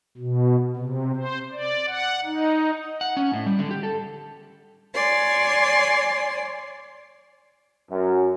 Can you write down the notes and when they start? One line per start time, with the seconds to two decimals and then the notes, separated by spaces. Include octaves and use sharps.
0.17 B2
0.76 C3
1.16 C5
1.52 D5
1.86 F#5
2.25 D#4
3.01 F#5
3.17 C#4
3.33 A2
3.46 G3
3.59 D3
3.71 G4
3.83 A4
4.94 C#5 D5 G#5 C6
7.91 F#2